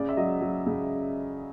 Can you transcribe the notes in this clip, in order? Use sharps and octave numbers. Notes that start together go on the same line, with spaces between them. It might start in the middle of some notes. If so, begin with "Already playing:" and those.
Already playing: C#3 D5
E5
F#3 D#5
F#3
C#3